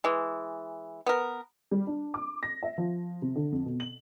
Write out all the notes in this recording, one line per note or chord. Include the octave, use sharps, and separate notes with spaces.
E3 G#3
B3 A#4
G3
D4
D6
A#6
E5
F3
C3
D3
F2
B2
F#7